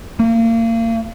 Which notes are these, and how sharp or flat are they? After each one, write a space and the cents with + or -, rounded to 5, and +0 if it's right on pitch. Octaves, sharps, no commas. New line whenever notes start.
A#3 -35